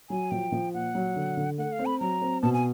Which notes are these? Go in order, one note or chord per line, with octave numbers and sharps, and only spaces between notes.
F#3 G#5
F3 G5
F3
A#2 F#5
F#3
D3
D3
A3 F#5
F5
C4
B5
F#3 A#5
C4
B2 A5
G#5